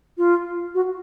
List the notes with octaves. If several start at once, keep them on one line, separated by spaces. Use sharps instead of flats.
F4
F#4